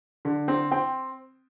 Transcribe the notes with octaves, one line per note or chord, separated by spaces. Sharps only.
D3
C4
C4 G5